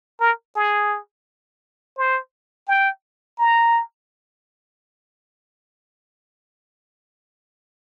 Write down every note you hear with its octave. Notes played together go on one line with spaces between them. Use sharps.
A#4
G#4
C5
G5
A#5